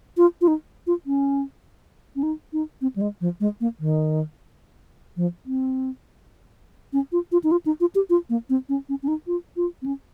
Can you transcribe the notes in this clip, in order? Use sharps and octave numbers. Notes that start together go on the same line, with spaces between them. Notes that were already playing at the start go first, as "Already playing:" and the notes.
F4
F4
D#4
F4
C#4
C#4
D#4
D#4
C4
G3
G#3
F3
G#3
A#3
D#3
F3
C4
C#4
F4
F4
D#4
F4
D#4
F4
G4
F4
A#3
C4
C#4
C#4
C#4
D#4
F4
F4
C4
C#4